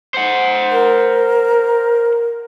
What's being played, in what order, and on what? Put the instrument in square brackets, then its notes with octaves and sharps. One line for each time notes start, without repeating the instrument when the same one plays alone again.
[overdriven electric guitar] C5 F#5
[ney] A#4